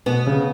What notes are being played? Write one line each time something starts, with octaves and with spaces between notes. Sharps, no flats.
B2 B3
C#3